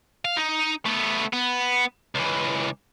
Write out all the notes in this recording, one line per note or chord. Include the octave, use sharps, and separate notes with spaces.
F5
D#4
A3 B3
B3
C#2 E3